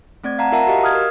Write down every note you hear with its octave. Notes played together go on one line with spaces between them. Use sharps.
A3 C4 D5 G#6
F5 F#5 A5 A#5
F4 A#4 E5 F#5 A5 A#5
F#4 G4 D#5 F5
D#6 F6 G#6
A#4